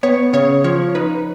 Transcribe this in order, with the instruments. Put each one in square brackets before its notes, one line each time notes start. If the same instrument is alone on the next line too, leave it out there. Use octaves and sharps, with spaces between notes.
[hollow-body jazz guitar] B3 [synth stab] C#5
[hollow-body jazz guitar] C#3 [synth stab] C#5
[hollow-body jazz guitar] F3 [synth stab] C#5
[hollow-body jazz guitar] D#4 [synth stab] B4